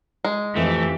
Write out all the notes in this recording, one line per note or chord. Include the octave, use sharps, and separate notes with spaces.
G#3
F2 E3 A3 G4